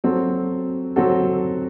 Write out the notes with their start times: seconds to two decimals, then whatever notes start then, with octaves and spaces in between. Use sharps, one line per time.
0.04 F#3 C4 F#4 A4
0.96 F#3 C4 F#4 A4